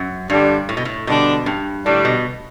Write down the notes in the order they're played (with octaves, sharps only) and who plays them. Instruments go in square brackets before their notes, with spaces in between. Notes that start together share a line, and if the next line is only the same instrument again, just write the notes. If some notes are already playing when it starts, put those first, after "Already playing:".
Already playing: [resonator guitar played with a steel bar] F#2
[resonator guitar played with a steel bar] G2 [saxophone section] D3 G3 D4
[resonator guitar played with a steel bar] A2
B2
A2
[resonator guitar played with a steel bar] B2 [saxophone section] D3 G3 D4
[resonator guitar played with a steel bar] G2
[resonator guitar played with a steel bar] A2 [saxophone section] D3 G3 D4
[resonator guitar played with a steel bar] B2